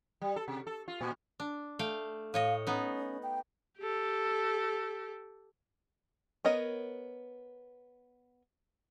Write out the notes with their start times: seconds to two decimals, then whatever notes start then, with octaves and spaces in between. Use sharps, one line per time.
0.22 G3
0.36 A4
0.48 C3
0.67 A4
0.88 F4
1.01 A#2
1.40 D4
1.79 A3 F5 G5
2.34 A2 C#5 D#5 F5
2.67 B3 C#4 D#4
3.23 G5
3.79 G4 A4
6.45 B3 A#4 C#5 D#5